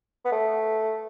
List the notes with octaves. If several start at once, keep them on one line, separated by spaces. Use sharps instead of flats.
B3
A3